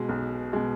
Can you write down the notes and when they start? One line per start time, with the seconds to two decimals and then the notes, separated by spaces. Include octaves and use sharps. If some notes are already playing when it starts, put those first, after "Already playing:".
Already playing: B2 G#3
0.09 B1
0.53 B2 G#3